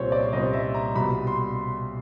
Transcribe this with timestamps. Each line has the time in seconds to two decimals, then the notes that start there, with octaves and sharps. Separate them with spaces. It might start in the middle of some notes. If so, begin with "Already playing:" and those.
Already playing: C2 A#2 G3 C4 C5 C#5
0.12 D5
0.33 C2 A#2 G3 C4 D#5
0.53 E5
0.74 A#5
0.95 C2 B2 G3 B5
1.27 C6